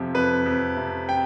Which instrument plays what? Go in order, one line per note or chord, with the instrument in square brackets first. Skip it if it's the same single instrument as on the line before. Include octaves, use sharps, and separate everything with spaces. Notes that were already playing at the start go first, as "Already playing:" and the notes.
Already playing: [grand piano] F2 C3 F3
F2 B4
F2
C3
G5